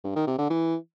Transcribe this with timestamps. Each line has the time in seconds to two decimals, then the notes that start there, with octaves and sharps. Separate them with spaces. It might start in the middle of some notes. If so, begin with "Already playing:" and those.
0.04 G2
0.16 D#3
0.27 C3
0.39 D3
0.50 E3